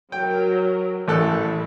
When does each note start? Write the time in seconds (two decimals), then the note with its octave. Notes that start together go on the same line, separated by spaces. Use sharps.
0.12 F#3 A#4 G5
1.08 A1 E4 A4 F#6